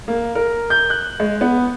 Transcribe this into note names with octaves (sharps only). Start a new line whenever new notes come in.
A#3
A#4
G6
F#6
G#3
B3